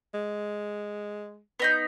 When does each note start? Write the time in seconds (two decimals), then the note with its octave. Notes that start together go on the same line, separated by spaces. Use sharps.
0.14 G#3
1.60 B3 D#4 G6